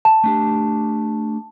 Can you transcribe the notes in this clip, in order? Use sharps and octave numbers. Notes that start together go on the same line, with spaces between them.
A5
A3 D4 G4